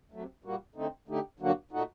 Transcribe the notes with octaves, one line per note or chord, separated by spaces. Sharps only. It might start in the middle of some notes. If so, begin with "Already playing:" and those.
C3 F#3 A3
A#2 G3 A#3 F#4
D3 A3 C4 D#4
D3 A3 D#4 G4
G2 D3 F#3 A#3 F#4
A#2 A3 D#4 F#4